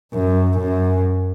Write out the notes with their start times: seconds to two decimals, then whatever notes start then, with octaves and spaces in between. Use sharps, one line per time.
0.13 F#2
0.59 F#2